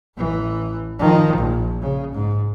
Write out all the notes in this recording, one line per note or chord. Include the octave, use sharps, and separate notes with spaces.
A1 E3
D#3 F3
A#1
C#3
G#2